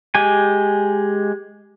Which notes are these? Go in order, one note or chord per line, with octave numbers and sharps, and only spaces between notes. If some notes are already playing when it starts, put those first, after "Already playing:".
G#3 G4 G#5